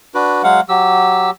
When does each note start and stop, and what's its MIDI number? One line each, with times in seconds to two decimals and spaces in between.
0.15 0.42 62
0.15 0.42 66
0.15 0.42 71
0.44 0.61 54
0.44 0.61 56
0.44 0.61 77
0.44 0.61 78
0.69 1.30 54
0.69 1.30 67
0.69 1.30 88